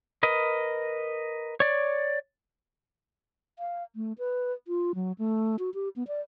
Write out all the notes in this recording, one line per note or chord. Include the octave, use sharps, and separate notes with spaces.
A#4 B4 D#5
C#5 D5
F5
A3
B4
F4
F#3
A3
F#4
G4
B3
D5